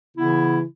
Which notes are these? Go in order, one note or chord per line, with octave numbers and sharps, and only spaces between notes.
C#3 E3 B3 E4